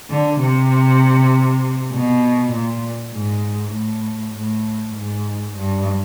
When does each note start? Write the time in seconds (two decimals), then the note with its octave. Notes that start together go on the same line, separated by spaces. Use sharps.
0.10 D3
0.41 C3
1.92 B2
2.53 A#2
3.14 G#2
3.74 A2
4.35 A2
4.96 G#2
5.57 G2